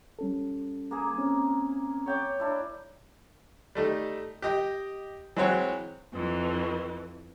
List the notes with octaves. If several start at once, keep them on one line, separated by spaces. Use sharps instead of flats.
G3 C#4 A4
A#3 G#4
C4 C#4
C#5 G5 D6
D4 E4
G3 A3 D#4
G4 D#5 G5
E3 F#3 G#3 C4 F#4 C#5
F2 E3